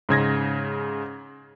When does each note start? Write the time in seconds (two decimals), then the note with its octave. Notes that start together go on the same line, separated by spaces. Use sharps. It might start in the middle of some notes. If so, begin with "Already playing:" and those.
0.09 G#2 C#3 G#6 A#6